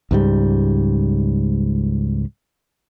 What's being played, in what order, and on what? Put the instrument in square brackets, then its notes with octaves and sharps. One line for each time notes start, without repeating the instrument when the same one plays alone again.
[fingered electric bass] C#2 G#2 G3